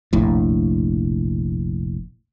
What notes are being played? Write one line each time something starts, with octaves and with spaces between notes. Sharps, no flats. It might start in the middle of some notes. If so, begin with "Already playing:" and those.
F1 A#1 A2